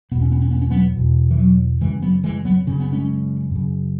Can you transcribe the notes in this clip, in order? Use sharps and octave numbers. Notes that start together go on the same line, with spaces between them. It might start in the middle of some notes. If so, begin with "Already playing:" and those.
E2 B2 B3
C#4
B3
C#4
B3
C#4
F#3 B3
E2 B2
E3
F#3
F#2 C#3 E3 G#3
F#3 B3
E3 G#3
F#3 B3
F#2 C#3 C#4
B3
G#3 C#4
F#2 C#3